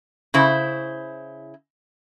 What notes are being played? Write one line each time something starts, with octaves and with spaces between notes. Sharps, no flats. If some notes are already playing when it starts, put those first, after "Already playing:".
C#3 E4 C5